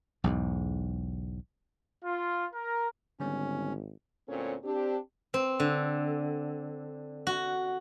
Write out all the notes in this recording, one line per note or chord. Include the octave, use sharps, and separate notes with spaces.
B1 E2 G#2
F4
A#4
G#1 D3 G3 B3 C#4
D2 A#2 C4 C#4 A4 C#5
C4 D4 G4
C4
D3
F#4